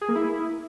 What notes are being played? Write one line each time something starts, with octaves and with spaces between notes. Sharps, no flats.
G#4
A#3
E4